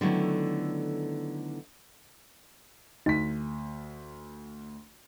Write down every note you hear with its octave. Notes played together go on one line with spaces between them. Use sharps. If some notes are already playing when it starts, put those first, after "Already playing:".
D3 D#3 F#3 A3 B3 E4
D2 D#4 B6